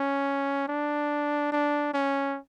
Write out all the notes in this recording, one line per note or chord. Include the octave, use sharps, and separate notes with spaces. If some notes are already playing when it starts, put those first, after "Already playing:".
Already playing: C#4
D4
D4
C#4